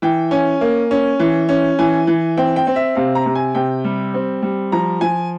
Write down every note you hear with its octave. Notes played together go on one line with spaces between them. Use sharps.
E3 G5
C#4 G#5
A#3
C#4
E3
C#4
E3 G#5
E3
C4 G5
G5
C4
E5
C3 F5
A#5
C3
G#5
C3 G5
G3
C4
G3
F3 A#5
F3 G#5